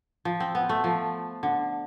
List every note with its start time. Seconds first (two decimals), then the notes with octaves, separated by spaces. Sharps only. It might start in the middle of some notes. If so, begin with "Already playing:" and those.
0.25 F3
0.40 C4
0.55 B3
0.69 A3
0.84 F3
1.43 D3